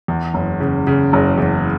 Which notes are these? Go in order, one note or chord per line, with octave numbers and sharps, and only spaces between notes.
E2
F#1
C#3
C#3
F#1
E2